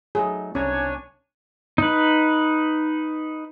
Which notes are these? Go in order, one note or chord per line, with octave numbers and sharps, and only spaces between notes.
F#3 A3 D#4 G#4
C2 C#4 D4 C#5 G#5 A#5
D#4 B4